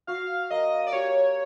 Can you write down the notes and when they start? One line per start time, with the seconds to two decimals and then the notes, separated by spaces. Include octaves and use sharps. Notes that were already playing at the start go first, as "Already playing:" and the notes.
0.07 F#4 F5
0.51 A#3 D#5
0.87 D5
0.93 G4 C#5